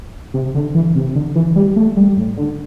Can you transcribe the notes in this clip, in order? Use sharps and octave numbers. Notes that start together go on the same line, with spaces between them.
C3
D3
E3
C3
D3
E3
G3
A3
G3
A2
D3